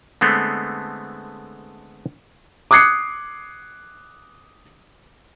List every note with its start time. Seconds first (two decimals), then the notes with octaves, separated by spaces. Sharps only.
0.21 D3 G#3 A3 B3 C4
2.71 D6 D#6 F#6 G#6 C7 C#7